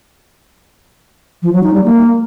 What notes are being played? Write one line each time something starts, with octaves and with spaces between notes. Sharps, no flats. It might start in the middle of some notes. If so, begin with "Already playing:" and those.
F3
F#3
D#4
G3
A#3